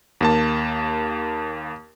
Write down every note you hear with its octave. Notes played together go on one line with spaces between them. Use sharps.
D#2 A#3 A5